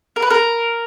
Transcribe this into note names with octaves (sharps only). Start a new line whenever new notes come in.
A#4
B4
A#4